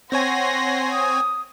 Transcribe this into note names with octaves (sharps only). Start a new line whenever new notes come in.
C4 C#5 F#5 G#5 C6 A#6
D#6